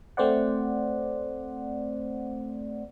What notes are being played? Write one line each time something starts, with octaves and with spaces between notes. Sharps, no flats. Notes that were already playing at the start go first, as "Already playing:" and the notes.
A3 C4 C5 D5 F#5